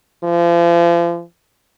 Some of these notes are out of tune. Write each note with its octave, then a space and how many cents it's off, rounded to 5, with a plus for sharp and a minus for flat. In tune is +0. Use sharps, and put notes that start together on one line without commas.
F3 -35